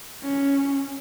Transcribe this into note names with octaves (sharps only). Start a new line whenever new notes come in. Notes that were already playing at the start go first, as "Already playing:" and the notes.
C#4